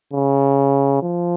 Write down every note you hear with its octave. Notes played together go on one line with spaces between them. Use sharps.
C#3
F3